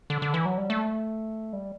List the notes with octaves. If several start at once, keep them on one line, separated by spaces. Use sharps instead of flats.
D3
D3
E3
F#3
G3
A3
G3